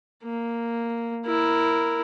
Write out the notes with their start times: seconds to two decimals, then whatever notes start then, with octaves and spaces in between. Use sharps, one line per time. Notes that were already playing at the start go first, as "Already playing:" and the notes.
0.24 A#3
1.26 E4 A#4